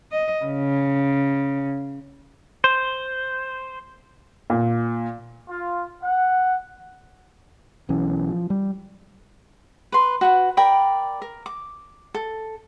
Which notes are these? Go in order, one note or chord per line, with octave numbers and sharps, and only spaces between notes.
D#5
C#3
C5
A#2
F4
F#5
B1 E3 C#4
F3
G3
B4 C6
F#4 B4 F#5
A#4 D5 G5 B5
A#4
D6
A4